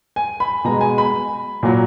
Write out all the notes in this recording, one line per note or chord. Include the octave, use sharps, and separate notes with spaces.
G#5
B5
B2 G#3 A#5
G#5
B5
A#2 F#3